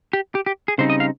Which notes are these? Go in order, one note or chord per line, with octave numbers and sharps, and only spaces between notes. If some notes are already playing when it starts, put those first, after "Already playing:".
G4
G4
G4
G#4
C#3 G3 C4 D#4 C5
D#5
F5